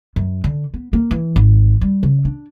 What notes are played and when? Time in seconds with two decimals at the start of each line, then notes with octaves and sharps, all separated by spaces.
0.16 F#2
0.44 D3
0.74 B3
0.93 A#3
1.11 E3
1.36 G#1
1.81 G3
2.03 C#3
2.25 D4